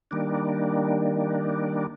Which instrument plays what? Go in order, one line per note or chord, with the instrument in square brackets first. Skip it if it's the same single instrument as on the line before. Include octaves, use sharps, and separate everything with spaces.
[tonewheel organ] D#3 G3 A#3 D4